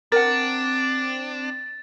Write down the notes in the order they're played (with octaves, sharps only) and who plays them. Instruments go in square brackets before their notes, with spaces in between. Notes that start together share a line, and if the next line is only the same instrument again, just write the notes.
[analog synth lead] C4 [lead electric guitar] D4 [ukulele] A#4 F#5 [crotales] A6